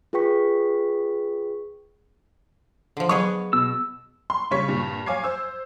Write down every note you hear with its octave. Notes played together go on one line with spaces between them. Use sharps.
F4 G#4 B4 G5 C#6 B6
D3 F3
F#3 B3 G#4 C#5 C#6
B2 E6
C6
A#1 C#3 G3 C#5 C#6 B6
G2 A#2
C#5 F5 G#5 D6 G#6 C7
C5 E6